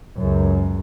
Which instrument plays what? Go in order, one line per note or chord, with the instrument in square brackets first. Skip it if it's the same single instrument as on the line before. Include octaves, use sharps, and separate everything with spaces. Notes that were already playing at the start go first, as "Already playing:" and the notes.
[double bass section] C#2 F#2